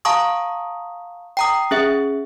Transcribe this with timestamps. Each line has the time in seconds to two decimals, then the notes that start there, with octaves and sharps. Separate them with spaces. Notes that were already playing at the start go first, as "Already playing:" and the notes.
0.05 F5 A5 A#5 C#6 D#6
1.37 G5 A#5 D#6
1.71 C#4 G#4 E5